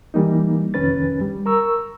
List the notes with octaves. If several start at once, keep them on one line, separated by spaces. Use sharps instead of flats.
E3 G3 A#3 D#4
C2 F2 D#3 C#4 B4 A6
G3
A#4 A#5 C#6 E6